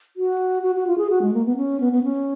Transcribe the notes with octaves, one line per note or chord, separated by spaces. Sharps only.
F#4
F#4
F#4
F4
G#4
F#4
G#3
A#3
B3
C#4
B3
B3
C#4